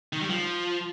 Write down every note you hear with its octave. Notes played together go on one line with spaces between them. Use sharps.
D#3
G3
F3